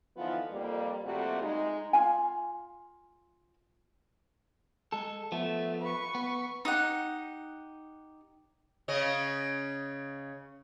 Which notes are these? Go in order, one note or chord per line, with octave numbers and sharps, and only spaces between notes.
D3 E3 F3 B3 D#4 F4
F2 G3 A#3
F2 C3 G3 A3 A#3 F#4
G#3 D#4
F4 F5 G#5
G#3 A4
F3 A3 B3
B4 C#6
B3
D#4 G4 F#5
C#3 C#4 D#5